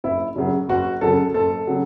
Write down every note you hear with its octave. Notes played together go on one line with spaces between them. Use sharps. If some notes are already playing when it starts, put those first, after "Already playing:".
F#1 E4
F#2 C#3 F#3
F#1 F#4
F#2 C#3 F#3 A4
F#1 A4
C#3 F#3